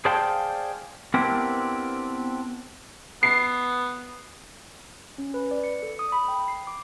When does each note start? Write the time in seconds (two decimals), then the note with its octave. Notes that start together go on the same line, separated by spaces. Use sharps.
0.05 G#4 C5 D5 F5 G5 A5
1.14 B3 C4 D4 E4 G4 A#4
3.23 B3 C7
5.18 C#4
5.34 B4
5.51 D5
5.64 C#7
5.82 A4
5.99 D#6
6.12 B5
6.28 G5
6.48 C7
6.67 D6